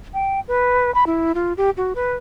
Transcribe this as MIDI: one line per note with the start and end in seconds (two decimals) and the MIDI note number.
0.14 0.40 79
0.48 0.93 71
0.95 1.04 83
1.07 1.32 64
1.35 1.53 65
1.57 1.70 67
1.77 1.93 66
1.95 2.16 71